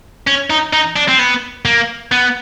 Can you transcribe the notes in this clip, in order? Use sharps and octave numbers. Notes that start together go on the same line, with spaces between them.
C#4
D#4
D#4
D4
C4
B3
A#3
B3